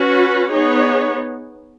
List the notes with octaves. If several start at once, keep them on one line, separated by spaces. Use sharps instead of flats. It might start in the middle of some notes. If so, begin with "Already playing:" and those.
Already playing: C#4 F#4 B4
B3 D#4 G#4 C#5